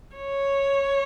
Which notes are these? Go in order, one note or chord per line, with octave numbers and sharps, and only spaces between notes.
C#5